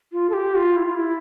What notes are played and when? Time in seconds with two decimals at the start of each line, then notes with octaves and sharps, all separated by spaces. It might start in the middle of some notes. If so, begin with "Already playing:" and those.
0.12 F4
0.29 A4
0.33 G4
0.55 F4
0.76 E4
0.85 F4
0.95 E4